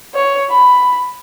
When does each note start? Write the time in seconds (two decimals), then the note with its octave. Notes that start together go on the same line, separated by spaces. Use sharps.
0.14 C#5
0.50 B5